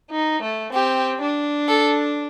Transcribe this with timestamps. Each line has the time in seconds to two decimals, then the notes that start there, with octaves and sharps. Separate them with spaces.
0.11 D#4
0.43 A3
0.74 C4 G4
1.21 D4
1.69 A4